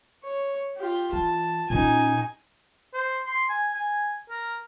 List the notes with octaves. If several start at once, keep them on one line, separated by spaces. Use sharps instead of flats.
C#5
F4 G4
E3 A5
A#2 C#4 D#4 G#5
C5
C6
G#5
G#5
A#4